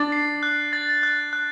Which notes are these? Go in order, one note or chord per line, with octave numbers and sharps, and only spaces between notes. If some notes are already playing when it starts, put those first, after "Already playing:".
Already playing: D4 A6
C7
F#6
A6
F#6
F#6